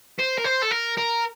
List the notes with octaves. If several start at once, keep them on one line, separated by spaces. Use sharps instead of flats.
C5
A#4
C5
A4
A#4
A#4